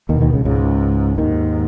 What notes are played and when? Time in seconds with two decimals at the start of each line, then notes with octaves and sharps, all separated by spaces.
0.09 D#2 B2 D#3
0.21 D#2 D#3
0.34 C#2 C#3
0.45 C#2 G#2 C#3
1.18 D#2 G#2 D#3